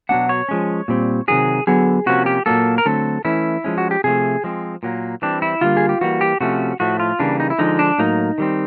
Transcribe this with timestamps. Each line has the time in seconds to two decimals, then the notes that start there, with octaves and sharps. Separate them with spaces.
0.09 B2 F#3 B3 D4 F#5
0.29 C#5
0.49 F3 G#3 C#4
0.88 A#2 G3 C4
1.28 C3 D#3 F#3 G#4
1.67 D3 F#3 B3 G#4
2.06 C3 F3 A#3 C#4 F#4
2.26 G4
2.46 A#2 F#3 A#3 A4
2.78 A#4
2.86 D3 F#3 A3 C4 A4
3.25 E3 A3 C#4 E4
3.64 F3 G#3 C#4
3.78 F#4
3.91 G4
4.04 C3 F3 A3 G#4
4.44 F3 G#3 C4
4.83 A#2 F#3 A#3
5.22 E3 G3 C4 D4
5.42 E4
5.61 D3 G3 A#3 F4
5.77 G#4
5.89 G4
6.01 E3 G3 A#3 F#4
6.21 G4
6.40 C3 F3 A3 C#4 F#4
6.80 A2 F3 A3 F#4
7.00 F4
7.19 C#3 E3 G3 A#3 D4
7.40 D#4
7.50 E4
7.59 D3 F3 G#3 D#4
7.79 D4
7.98 A2 F#3 A#3 D#4
8.38 D#3 G3 C4